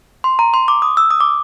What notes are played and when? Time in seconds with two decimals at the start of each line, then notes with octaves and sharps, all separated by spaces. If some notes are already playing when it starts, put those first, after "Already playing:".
0.24 C6
0.39 A#5
0.54 C6
0.68 D6
0.82 D#6
0.97 E6
1.11 D#6
1.20 D6